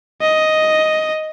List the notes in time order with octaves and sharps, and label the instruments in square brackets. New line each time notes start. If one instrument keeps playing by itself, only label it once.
[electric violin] D#5